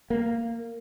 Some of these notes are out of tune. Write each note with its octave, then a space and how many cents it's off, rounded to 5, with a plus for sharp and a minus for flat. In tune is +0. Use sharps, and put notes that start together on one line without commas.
A#3 -15